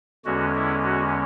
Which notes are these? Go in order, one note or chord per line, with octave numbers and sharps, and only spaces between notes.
E2 D3 G#3 C#4 F#4
E4
F#4